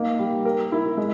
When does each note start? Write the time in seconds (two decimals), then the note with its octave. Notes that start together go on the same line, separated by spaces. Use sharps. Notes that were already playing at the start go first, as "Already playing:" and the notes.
Already playing: A#3 D#4
0.19 G3
0.45 A#4
0.72 E4
0.97 G#3